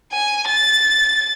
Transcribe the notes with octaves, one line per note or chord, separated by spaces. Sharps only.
G#5
A6